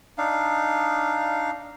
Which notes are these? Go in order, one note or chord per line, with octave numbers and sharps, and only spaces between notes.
D4 D#4 F5